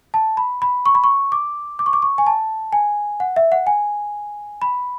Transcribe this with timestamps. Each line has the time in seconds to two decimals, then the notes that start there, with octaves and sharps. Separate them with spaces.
0.14 A5
0.37 B5
0.62 B5
0.86 C#6
0.95 B5
1.04 C#6
1.32 D6
1.79 D6
1.86 C#6
1.93 D6
2.02 C#6
2.18 G#5
2.27 A5
2.73 G#5
3.20 F#5
3.36 E5
3.52 F#5
3.67 G#5
4.62 B5